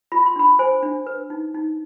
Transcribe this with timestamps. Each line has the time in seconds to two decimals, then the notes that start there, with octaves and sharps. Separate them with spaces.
0.12 F4 B5
0.26 C6
0.36 D4 B5
0.59 C5 G#5
0.83 D4
1.07 B4
1.30 D#4
1.55 D#4